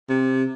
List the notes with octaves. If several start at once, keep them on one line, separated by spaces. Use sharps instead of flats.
C3